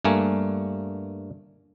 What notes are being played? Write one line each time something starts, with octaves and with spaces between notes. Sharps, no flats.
G2 A3 A#3 G#5